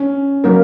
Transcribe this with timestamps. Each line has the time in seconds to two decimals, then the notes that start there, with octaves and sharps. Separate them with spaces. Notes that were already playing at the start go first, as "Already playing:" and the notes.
Already playing: C#4
0.44 F#3 A#3 D#4 A#4